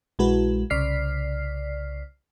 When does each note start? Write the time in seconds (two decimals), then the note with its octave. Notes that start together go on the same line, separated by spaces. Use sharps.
0.19 A#1 G#3 E4 F#4 B4
0.70 C2 C#3 D5 F6 B6 C7